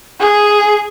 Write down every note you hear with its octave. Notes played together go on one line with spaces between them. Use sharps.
G#4